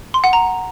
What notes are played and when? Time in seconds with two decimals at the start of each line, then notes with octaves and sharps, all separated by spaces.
0.14 C6
0.24 F#5
0.33 A#5